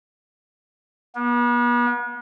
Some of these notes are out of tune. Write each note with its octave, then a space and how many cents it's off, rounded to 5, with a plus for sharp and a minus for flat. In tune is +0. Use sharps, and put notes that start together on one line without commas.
B3 -40